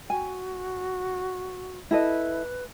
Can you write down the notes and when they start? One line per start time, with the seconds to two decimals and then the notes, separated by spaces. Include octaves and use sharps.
0.10 F#4 G#5
1.91 E4 A4 B4 D#5